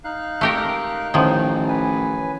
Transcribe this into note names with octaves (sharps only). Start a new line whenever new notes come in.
D#4 F5 F#6
A3 G4 A#4
A1 D#3 F3 D#4
B4 G#5